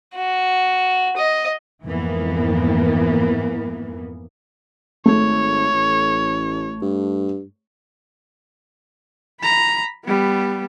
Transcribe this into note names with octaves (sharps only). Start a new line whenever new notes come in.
F#4
D#5
F2 G#2 E3 A#3 B3
G#1 A3 C#5
A1
G2
A#5 B5
G3 B3